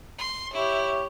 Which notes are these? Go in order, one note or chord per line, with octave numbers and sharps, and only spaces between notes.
C6
E4 G4 C#5